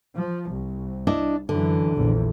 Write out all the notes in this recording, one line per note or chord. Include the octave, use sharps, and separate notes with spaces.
F3
C2
D4 E4 D#5
F#2 D3 E3
A#1 E2